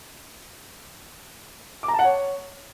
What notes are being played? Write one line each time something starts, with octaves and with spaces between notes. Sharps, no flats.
D6
A#5
A5
F#5
C#5